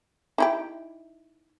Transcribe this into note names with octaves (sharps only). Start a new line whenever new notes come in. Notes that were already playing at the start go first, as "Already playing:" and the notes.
D#4 E4 G4